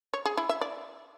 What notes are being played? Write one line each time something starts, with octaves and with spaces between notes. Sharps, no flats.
C#5
G#4
E4
E5
D5